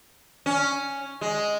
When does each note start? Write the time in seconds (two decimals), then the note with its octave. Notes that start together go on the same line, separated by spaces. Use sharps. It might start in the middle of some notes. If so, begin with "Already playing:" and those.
0.46 C#4
1.21 G#3